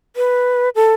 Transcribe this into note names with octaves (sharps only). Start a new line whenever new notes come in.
B4
A4